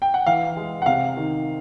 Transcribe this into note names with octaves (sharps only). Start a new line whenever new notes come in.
G5
F#5
E3 F5
G#3
F#5
C3 F5
D#3